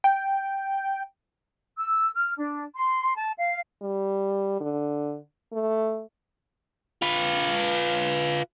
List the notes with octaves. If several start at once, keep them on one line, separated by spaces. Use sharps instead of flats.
G5
E6
F6
D4
C6
A5
F5
G3
D3
A3
F4 B4